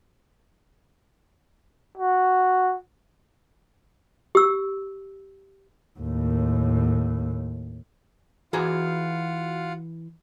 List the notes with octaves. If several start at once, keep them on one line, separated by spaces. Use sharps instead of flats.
F#4
G4 E6
D#2 A2
E3 F4 F#4 G#4 F5 F#5 A#5